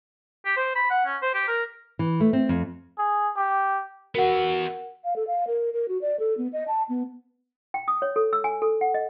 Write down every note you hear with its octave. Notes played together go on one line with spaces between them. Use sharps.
G4
C5
B5
F#5
C#4
C5
G4
A#4
E3
A3
C4
F2
G#4
G4
B3 F#4 A#4 E5 F#5
F5
A4
F5
A#4
A#4
F#4
D5
A4
B3
D#5
A5
B3
G5
D#6
C#5
A4
E6
G#5
A4
F#5
D#5